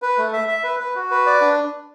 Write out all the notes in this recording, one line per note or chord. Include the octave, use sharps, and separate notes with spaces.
B4
A3
E5
E5
B4
B4
F#4
B4
D5
D4